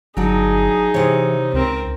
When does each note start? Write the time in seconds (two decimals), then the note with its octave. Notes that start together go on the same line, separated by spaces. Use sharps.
0.17 G1 F#3 D4 D#4 G#4
0.94 C3 E3 C#5
1.54 C#2 C4 A#4